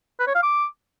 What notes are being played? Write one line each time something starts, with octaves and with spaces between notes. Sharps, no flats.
B4
C#5
F5
D6